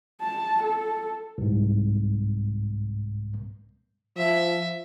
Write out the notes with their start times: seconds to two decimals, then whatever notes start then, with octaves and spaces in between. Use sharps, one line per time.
0.21 A5
0.64 A4
1.38 C2 G#2
4.17 F3 E5